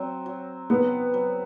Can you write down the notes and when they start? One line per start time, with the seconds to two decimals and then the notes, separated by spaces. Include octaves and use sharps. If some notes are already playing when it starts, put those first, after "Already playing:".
Already playing: F#3 C4
0.26 F#3
0.70 F#3 B3
1.14 F#3